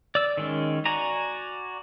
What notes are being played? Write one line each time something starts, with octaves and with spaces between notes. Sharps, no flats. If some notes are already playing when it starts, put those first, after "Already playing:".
D5 E6
D#3 G#3 C#4
F#4 D5 G#5 A#5